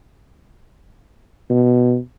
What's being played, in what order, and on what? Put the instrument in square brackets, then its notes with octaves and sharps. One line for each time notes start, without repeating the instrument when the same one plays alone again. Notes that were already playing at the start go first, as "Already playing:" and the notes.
[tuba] B2